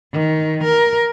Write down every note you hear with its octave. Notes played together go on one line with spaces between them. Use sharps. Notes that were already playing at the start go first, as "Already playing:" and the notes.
D#3
A#4